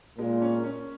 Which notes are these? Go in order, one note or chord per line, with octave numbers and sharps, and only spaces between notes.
A#2 G#3
C#4
C#4